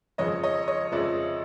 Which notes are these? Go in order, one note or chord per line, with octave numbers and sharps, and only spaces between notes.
F2 C#3 F3 C#5 D#5
C#5 D#5
C#5 D#5
F2 C#3 F3 D5 E5